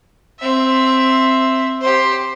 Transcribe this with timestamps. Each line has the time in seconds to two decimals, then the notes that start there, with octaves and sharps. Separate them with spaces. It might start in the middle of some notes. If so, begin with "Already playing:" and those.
0.39 C4 E5
1.81 G4 C5